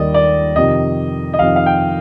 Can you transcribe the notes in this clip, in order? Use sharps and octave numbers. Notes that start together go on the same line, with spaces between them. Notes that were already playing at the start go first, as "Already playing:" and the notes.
Already playing: D#2 D#3 G3 A#3 D5 D#5
D5
F2 C3 D#3 D#5
D#5
F2 C3 D#3 F5
F5
G5